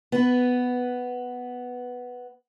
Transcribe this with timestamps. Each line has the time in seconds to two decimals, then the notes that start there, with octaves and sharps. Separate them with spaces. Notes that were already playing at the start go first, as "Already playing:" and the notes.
0.12 B3 B4